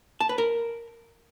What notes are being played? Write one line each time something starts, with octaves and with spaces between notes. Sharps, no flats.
A5
B4
A#4